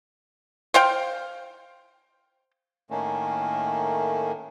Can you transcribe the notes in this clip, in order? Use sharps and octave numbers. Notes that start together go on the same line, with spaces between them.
C5 F5 G5
A2 D#3 A3 A#3 C#4